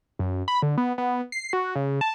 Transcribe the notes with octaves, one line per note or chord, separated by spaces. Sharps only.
F#2
B5
D3
B3
B3
C7
F#4
C#3
A5